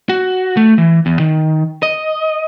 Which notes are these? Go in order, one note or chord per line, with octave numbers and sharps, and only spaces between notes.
F#4
A3
E3
E2
D#3
D#5